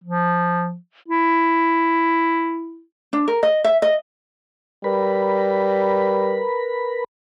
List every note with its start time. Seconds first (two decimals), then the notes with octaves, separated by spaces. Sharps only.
0.04 F3
1.09 E4
3.13 D4
3.28 A#4
3.43 D#5
3.64 E5
3.82 D#5
4.84 G3 A#4 B4 B5